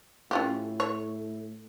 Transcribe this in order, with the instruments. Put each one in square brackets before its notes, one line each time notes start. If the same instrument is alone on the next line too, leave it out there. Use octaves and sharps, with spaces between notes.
[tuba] A2 [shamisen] C#4 F4 G4
[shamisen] C#5